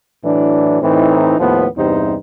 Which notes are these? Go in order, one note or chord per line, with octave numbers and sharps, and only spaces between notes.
A2 E3 F#3 D4
A2 E3 C4 D#4
D#2 A2 F3 B3
E2 G2 C3 D#4 C5